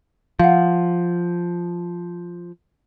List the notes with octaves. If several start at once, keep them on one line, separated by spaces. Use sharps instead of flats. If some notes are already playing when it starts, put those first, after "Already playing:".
F3 F5 F#5